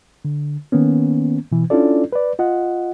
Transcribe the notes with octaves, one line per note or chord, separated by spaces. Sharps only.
D3
D#3 A#3 B3 C#4
B2 E3
C#4 D4 E4 F4 A4 D5
B4 D5
F4 D#5 F#5